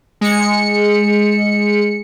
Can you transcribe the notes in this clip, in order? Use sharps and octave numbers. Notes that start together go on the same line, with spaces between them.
G#3 C#7